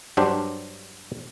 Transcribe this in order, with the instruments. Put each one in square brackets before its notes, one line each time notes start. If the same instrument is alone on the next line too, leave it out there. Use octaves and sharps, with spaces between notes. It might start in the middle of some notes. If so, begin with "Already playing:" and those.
[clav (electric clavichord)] G2 F#3 D4 G4 C5